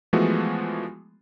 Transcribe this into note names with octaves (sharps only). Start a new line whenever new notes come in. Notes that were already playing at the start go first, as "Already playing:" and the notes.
E3 F3 G#3 A3 B3 F#4